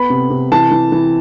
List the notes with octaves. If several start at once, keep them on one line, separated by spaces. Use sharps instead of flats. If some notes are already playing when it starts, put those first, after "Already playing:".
Already playing: B3 B5
C3
C3
E3 A5
E3
E3